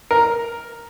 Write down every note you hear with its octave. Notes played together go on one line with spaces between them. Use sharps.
A#4